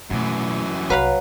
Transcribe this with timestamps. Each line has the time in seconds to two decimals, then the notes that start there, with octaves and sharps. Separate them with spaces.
0.10 F#2 B2 E3 A3
0.90 C2 F#3 D4 B4 F5 B5